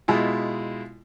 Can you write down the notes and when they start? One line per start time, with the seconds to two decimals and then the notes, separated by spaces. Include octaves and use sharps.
0.08 B2 G#3 E4 F4